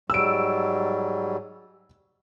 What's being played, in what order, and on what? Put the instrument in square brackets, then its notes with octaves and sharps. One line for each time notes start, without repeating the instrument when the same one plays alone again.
[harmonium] G#2 F#3 G3 [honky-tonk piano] E6 D7